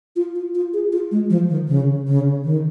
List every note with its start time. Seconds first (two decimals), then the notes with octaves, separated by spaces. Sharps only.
0.16 F4
0.35 F4
0.55 F4
0.74 G#4
0.92 F4
1.11 G#3
1.30 F3
1.49 D#3
1.68 C#3
2.07 C#3
2.44 D#3